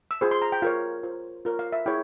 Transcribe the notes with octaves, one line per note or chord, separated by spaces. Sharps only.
E6
F4 G#4 C5
C6
A#5
G5
F4 A#4 C#5 F5
F4 C5
F4 A#4 C#5
F5
E5
E4 G#4 C#5 G5